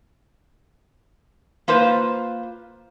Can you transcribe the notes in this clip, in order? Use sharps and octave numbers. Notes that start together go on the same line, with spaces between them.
A#3 F4 B4 C5